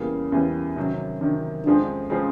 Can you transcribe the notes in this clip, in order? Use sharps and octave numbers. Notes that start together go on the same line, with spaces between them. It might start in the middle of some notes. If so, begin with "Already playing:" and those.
Already playing: E2 C#3 E3 G3 A#3
E2 C#3 E3 G3 A#3 C#4
C3 D#3 F#3 C#4
C3 D#3 F#3 D4
F2 C#3 F3 G#3 C4 D4
C#3 F3 G#3 C4